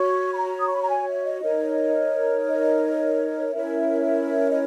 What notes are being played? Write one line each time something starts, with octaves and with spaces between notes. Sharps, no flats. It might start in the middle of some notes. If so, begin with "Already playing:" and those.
Already playing: F#4 C#5 C#6
B5
A#5
D#6
C#6
B5
A#5
G#5
E5
D#5
D#4 A#4 C#5
D#5
C#4 E4 A#4 C#5 E5
D#5